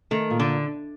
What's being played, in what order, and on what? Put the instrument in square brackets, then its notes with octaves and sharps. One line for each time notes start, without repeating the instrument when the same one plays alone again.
[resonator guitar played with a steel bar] D#3 [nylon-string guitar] A3
[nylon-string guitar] A#2
[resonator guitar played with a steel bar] D3